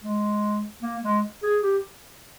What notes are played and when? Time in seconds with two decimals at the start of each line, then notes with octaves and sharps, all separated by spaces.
0.04 G#3
0.82 A#3
1.03 G#3
1.43 G#4
1.63 G4